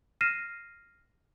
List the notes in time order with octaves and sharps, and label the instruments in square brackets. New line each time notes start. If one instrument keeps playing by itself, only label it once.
[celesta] F6 A#6 C7 D#7 E7